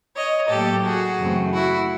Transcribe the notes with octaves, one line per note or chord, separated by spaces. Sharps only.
C#5 D#5
A2 F#3 A#3 G4 A4
F#4 G#4
F#2 C#3 E3 A3 C4
E4 F#4